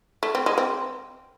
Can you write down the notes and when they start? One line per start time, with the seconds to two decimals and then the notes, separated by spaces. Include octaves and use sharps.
0.23 A3
0.35 C4
0.46 G#3
0.58 C4